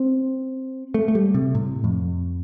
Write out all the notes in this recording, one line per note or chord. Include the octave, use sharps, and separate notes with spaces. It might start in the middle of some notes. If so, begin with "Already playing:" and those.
Already playing: C4
A3
A3
G3
C3
A2
F2